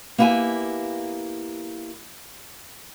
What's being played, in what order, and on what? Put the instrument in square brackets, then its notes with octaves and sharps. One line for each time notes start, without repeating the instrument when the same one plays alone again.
[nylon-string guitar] A#3 B3 E4 G4 G#5